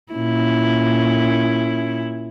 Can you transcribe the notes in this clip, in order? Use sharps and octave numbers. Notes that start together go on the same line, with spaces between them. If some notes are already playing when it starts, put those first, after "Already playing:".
A#2 C#4 E4